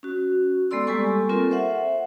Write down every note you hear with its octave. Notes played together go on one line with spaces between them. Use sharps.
C#4 F#4
G#3 B3 A4 D5 C6 E6
G3 A#3 G4 A4 G#5 C#6
C4 F4 A4 A#4
C5 E5 F#5